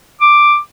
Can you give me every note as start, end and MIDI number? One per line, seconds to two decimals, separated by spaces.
0.21 0.57 86